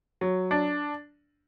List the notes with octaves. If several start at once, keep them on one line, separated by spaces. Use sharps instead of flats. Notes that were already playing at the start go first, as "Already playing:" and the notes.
F#3
D4